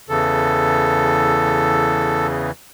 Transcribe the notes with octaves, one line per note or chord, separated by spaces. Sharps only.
E2 C#3 E3 A4